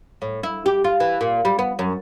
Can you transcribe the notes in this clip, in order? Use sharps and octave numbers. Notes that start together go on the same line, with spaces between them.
A2
E4
G4
F4
E3
A#2
G3
B3
F#2